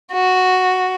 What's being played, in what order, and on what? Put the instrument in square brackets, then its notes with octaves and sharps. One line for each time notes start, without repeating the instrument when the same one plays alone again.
[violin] F#4